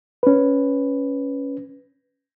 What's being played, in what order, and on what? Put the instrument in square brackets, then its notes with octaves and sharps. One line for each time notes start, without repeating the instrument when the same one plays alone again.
[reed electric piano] C#4 B4